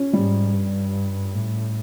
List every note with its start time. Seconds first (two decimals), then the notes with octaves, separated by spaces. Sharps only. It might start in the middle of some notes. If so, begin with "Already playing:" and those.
Already playing: C#4
0.13 G#2 G3
0.53 G2
1.34 A2